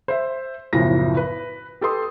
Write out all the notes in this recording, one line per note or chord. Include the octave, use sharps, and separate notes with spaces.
C5 E5
F#1 B1 A2 F3 A#6
B4
G4 A4 B4 C6 D#6